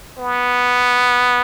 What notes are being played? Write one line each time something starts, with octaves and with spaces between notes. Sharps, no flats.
B3